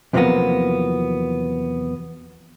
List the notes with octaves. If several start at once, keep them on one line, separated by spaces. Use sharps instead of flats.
E2 C3 F3 F#3 A#3 B3